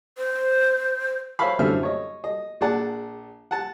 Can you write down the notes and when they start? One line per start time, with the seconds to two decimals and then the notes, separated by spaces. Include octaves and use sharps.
0.18 C5
1.39 C5 C#5 E5 F5 B5
1.59 F#2 A2 D3 C5 E5 F6
1.83 C#5 D#5
2.24 D#5
2.61 A#1 G#4 D5 F#5 A5
3.51 F#5 A5